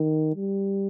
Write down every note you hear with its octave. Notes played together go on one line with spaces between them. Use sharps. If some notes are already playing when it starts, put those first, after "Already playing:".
Already playing: D#3
G3